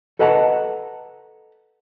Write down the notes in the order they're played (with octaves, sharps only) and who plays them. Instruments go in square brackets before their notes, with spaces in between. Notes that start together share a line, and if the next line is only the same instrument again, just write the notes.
[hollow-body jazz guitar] A4 B4 D#5 F#5 A5 A#5